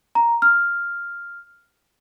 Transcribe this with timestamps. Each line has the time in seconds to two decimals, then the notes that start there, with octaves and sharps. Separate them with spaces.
0.15 A#5
0.42 F6